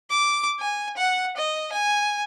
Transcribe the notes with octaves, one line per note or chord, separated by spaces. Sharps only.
D6
G#5
F#5
D#5
G#5